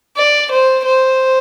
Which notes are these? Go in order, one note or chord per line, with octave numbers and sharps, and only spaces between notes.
D5
C5
C5